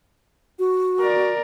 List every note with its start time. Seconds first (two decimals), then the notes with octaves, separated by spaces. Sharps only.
0.59 F#4
1.00 A#4 D5